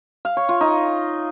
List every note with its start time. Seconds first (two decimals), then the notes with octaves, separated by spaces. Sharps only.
0.25 F5
0.37 C#5
0.49 F4
0.61 D#4